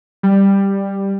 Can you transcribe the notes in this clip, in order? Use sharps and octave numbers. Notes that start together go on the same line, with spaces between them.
G3